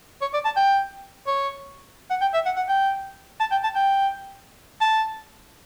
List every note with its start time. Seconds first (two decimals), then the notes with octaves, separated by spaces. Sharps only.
0.21 C#5
0.34 D5
0.45 A5
0.56 G5
1.27 C#5
2.10 F#5
2.21 G5
2.34 E5
2.46 F#5
2.57 F#5
2.68 G5
3.40 A5
3.51 G5
3.63 A5
3.76 G5
4.81 A5